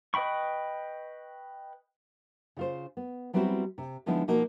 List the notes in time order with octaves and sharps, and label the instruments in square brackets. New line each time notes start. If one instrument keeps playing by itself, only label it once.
[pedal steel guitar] B4 D#5 G5 B5 C#6
[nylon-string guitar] C#3 F4 C5
B3
F#3 G3 B3 C4 E4 F#4
C3
D3 F3 G#3 B3 D#4 E4
B2 F3 A#3 D#4 F#4